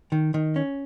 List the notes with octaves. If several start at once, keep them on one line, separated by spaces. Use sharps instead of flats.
D#3
D#3
C#4